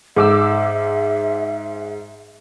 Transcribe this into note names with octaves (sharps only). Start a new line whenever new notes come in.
G#2 E5 D6 E6